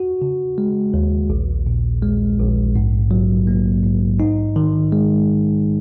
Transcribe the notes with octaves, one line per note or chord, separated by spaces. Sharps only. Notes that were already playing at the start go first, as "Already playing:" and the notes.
Already playing: F#4
C#3
G#3
D#2
A#1
A#2
G#3
A#1
G#2
F#3
A#3
G#2
D#4
D#3
G#3